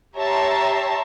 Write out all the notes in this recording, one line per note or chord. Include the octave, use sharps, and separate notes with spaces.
G4 C#5 E5 A5 A#5 C6